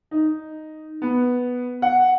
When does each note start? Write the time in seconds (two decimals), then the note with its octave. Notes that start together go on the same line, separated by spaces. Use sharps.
0.11 D#4
1.02 B3
1.82 F#5